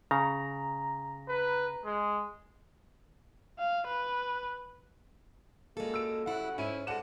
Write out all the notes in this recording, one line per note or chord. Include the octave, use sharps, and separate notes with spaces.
C#3 A#5
B4
G#3
F5
B4
F#2 A#2 G#3 A#3 A4
E6 D7
C#3 F#3 G3 E4 F#5
G#2 C#4 E4 D#7
G#3 F4 A4 D5 F#5 E7